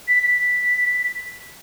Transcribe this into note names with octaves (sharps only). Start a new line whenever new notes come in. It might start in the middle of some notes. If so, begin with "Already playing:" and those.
B6
B6